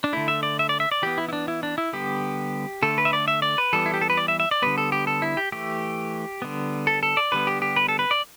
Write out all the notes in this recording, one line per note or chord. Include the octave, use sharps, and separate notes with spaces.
D4
D3 A3 E4
E5
D5
E5
D5
E5
D5
E3 B3 G4
E4
E4
D4
E4
D4
E4
D3 G3 B3 G4
D3 A3 A4
B4
E5
D5
E5
D5
B4
E3 G3 B3 A4
E4
G4
A4
B4
D5
E5
E5
D5
D3 G3 B3 B4
A4
G4
A4
E4
G4
E3 A3 G4
D3 G3 B3
A4
A4
D5
D3 G3 B3 B4
G4
G4
B4
A4
B4
D5